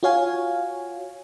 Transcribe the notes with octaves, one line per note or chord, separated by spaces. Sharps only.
F4 F#4 C#5 F5 G#5